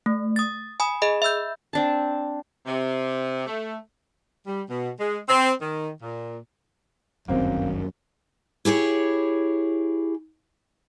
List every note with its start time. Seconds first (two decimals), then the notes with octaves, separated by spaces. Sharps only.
0.06 A3
0.36 D#6 A6
0.80 G#5 B5 D#6
1.02 G#4 D#5 B5
1.22 E5 B5 E6 G6
1.73 C4 D4 A5
2.66 C3
3.47 A3
4.46 G3
4.69 B2
4.99 G#3
5.29 C4
5.60 D#3
6.02 A#2
7.28 D1 G1 F#2 D#3 A#3 C4 D4
8.65 E4 G4 G#4 C#5